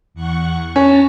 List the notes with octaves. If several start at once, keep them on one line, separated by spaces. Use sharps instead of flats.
E2 F#5 C#6
C#4 A5 A#5